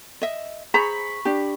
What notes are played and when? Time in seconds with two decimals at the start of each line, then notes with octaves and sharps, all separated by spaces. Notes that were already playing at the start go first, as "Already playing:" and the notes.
0.22 D#5 E5
0.74 G#4 C5 A#5 B5 C#6
1.25 D4 G4